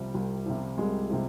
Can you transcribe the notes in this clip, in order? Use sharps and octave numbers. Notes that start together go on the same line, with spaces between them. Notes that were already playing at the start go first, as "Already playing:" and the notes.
Already playing: C2 C3 F3 G3
C2
C3 F3
C2 G#3
C3 F3